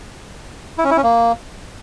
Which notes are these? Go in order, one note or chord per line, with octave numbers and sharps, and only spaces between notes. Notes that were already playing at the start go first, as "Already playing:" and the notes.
E4
C#4
E4
C#4
A#3